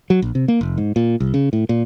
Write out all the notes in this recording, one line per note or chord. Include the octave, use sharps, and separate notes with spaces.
F#3
A#1
C3
A#3
F1
G#2
A#2
C2
C#3
A2
A#2